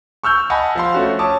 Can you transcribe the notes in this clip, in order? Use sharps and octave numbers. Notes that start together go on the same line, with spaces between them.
C#6 E6 F6 G6
D#5 F#5 G#5 A5 B5
F3 F5 C6
A3 C#4 F#4
C#5 A5 D6 D#6